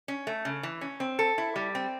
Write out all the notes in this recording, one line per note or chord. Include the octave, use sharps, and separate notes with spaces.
C#4
A3
C#3
E3
C#4
C4
A4
E4
G3
C4